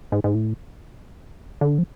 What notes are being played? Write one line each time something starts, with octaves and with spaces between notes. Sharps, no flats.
G#2
G#2
A2
D3
F3